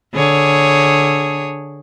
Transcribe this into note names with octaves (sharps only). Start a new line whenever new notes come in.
D3 G#4 C#5